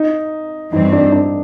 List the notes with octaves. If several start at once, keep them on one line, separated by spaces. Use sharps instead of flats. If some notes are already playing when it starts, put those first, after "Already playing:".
Already playing: D#4
G2 E3 G3 C4 D#4
D4
D4